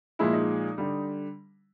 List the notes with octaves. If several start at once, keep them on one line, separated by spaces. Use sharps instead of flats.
A#2 F3 G#3 E4
D#4
D3 G3